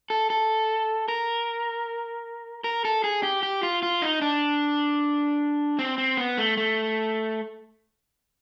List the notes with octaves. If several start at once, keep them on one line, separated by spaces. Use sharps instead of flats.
A4
A4
A#4
A#4
A4
G#4
G4
G4
F4
F4
D#4
D4
C4
C4
B3
A3
A3